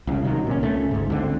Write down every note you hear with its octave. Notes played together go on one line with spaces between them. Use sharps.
C2 C#3
C3 D#3 F#3
A#2 C#4
C#2 A3 C#4
G1 G#2
C#2 D3 C4